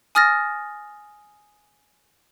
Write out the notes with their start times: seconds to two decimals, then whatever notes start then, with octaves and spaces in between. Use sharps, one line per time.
0.15 G#5 D#6 F6 A6 A#6